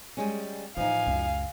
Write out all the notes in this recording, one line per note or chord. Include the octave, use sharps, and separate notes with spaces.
G3 G#3 C#4
A2 E3 F3 D#4 F5 G#5
C#2 F#2